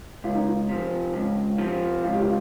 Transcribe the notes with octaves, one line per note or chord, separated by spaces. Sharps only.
C#2 F4
D#4
F4
C3 F3
C#2
C3 F3
C#2 F4
G4
F4